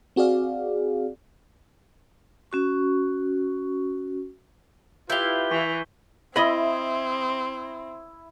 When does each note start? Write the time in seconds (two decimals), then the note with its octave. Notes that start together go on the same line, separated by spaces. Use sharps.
0.16 C4 F#4 G#4 D5 F5
2.52 C#4 F#4 C#6
5.10 E4 F4 G4 B4 F5 G6 G7
5.51 E3 G#5 C#6 B6
6.36 C4 E4 D#5 E5 B5 D#6